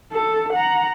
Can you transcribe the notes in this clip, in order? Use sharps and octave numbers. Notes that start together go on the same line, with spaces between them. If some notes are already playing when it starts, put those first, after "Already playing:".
A4
F#5 A#5